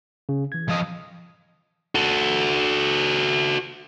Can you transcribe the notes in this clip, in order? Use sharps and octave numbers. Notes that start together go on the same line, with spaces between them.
C#3
E3 G#6
F3 D#5
F#4 A4